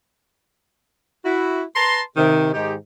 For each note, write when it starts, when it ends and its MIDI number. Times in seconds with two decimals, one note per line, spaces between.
1.24 1.62 64
1.24 1.62 66
1.75 2.01 71
1.75 2.01 81
1.75 2.01 82
1.75 2.01 84
2.17 2.54 48
2.17 2.54 51
2.54 2.74 44
2.54 2.74 51
2.54 2.74 63
2.54 2.74 67